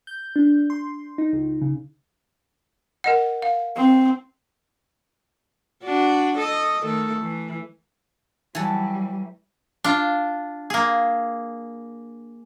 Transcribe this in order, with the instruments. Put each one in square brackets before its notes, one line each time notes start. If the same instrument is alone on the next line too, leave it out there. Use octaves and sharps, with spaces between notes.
[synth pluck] G6
D4
C6
D#4
C#2
C#3
[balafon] A#4 D#5 F#5
F5
[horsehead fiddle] C4
[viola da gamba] D4 F#4
A4 D#5
D#3 A3 A4
E3
[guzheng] E3 A4 [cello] F#3 G3
[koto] D4 F4
A#3 G#4